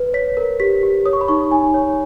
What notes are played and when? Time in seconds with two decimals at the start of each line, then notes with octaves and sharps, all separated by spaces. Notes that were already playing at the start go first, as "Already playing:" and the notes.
Already playing: B4
0.14 C#5 B6
0.37 A#4
0.60 G4 B6
0.83 G4
1.06 C#5 D#6
1.13 C#6
1.21 B5
1.28 D#4 C#6
1.51 D#4 G#5
1.74 C#5